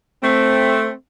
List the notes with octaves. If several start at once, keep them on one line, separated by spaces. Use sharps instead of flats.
A3 C4